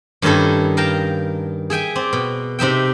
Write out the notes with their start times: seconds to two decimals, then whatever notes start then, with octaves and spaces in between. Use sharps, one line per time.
0.22 G2 D#3 C#4 D#4 E4 A4
0.77 A#4 F5 G5 A5 A#5
1.70 G#4 E5 G5 G#5
1.96 C4 D5
2.13 B2
2.59 C3 D#4 E5 G5